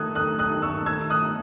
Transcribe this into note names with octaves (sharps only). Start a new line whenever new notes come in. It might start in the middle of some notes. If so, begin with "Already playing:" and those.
Already playing: D#3 A3 D#4 A4 D#6 F#6 G#6
D#6 F#6
D#6 F#6
C#6 E6
E6 G#6
D#6 F#6